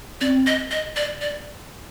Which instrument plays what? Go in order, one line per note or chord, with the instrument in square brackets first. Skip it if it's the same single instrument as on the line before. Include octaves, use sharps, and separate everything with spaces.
[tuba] C4 [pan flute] D5
[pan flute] D#5
D#5
D5
D5